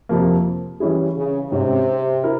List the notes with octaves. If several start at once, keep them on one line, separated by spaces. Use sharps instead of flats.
F2 C3 F3 A#3
E3 G3 C#4 E4 G#4
C#3
G#2 C3 G3 C#4
E4 A#4